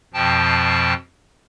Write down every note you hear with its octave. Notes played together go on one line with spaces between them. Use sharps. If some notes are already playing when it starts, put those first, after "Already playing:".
F2 B2 F3 G5 A5